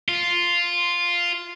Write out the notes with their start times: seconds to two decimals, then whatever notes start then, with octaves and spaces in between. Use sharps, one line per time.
0.09 F4